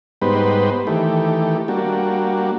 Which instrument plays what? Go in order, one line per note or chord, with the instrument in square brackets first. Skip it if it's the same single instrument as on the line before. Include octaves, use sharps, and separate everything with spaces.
[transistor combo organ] G#2 G3 B3 D#4 B4 C5
D#3 E3 A3 G4
G3 A#3 D4 F#4